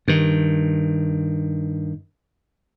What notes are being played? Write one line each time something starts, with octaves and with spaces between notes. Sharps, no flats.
G2 D#3